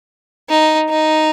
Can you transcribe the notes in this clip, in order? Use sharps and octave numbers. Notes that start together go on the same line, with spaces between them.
D#4
D#4